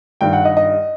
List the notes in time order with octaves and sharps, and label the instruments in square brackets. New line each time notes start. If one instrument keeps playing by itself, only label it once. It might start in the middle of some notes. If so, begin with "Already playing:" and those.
[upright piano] G2 D#3 G3 G5
F#5
D#5
D#5